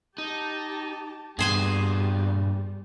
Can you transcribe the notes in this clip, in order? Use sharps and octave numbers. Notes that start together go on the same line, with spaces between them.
D#4 G4 A5
G2 A#2 G3 B3 G#4 C5 G#5